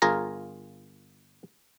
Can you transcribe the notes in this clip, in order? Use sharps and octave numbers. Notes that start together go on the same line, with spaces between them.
G1 F4 G#4 A#4 A#5